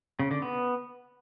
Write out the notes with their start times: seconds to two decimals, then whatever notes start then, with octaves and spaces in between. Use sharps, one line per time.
0.19 C#3
0.31 D3
0.42 B3